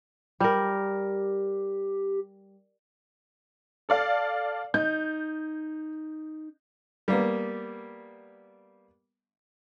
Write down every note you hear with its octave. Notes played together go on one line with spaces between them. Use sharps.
G3 G4 A#4
A4 D5 F5
D#4 G6
G3 A#3 B3